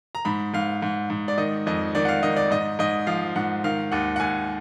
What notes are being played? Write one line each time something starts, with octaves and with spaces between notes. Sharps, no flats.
A#5
G#2 B5
G#2 F5
G#2
G#2
D5
D#3 D#5
F2 D#5
D#3 D5
F#5
F5
D#3 D#5
D5
G#2 D#5
G#2 D#5
F3 F5
G#2 F#5
D#3 F5
D#2 F#5
F#5
D#2 G#5